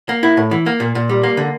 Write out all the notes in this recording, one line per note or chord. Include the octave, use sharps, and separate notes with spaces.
A#3
E4
A2
E3
A#3
A#2
A#2
G3
A#3
D3